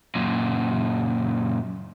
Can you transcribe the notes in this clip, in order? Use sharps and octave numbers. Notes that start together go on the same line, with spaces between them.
F#2 A#2